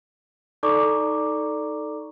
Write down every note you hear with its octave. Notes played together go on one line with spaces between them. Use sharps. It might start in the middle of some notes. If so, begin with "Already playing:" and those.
D#4 A4 D5 A#5 C#6 D6